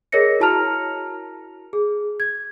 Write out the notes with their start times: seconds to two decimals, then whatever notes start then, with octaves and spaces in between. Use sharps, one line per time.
0.12 G#4 A#4 C#5 D#5 A#6 C#7
0.40 E4 F#4 A5 A#5 F6 F7
1.73 G#4
2.20 G#6